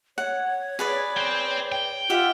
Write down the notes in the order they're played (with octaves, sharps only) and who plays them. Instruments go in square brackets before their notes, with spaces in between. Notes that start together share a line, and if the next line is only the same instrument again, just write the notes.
[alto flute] C#5 [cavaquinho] F#5
[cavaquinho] G#4 B4 D5
[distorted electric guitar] C5 G5
G5
[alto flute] F4 [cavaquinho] G4 E5 F#5